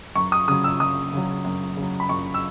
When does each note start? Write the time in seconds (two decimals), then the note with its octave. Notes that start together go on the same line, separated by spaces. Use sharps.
0.15 F#2 C#6
0.32 D#6
0.48 C#3 F#3 D#6
0.64 E6
0.80 F#2 D#6
1.13 C#3 F#3
1.45 F#2
1.77 C#3 F#3
2.00 B5
2.09 F#2 C#6
2.34 E6